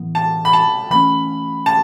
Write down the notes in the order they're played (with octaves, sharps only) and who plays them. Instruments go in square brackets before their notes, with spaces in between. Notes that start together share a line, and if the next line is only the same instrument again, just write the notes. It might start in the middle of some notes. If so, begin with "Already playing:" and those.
Already playing: [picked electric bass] A2 E3 B3
[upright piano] A5
B5
A5
[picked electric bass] E3 A3 C#4 [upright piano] B5
[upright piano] A5